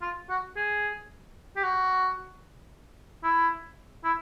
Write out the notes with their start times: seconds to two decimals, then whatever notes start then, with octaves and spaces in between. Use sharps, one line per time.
0.02 F4
0.29 F#4
0.56 G#4
1.56 G4
1.63 F#4
3.23 E4
4.04 E4